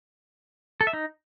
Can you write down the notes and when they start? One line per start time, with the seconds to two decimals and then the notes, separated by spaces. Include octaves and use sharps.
0.81 A4
0.87 E5
0.93 D#4